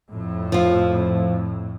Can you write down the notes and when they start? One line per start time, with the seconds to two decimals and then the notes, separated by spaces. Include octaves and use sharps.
0.12 F2 A2
0.52 F3 F4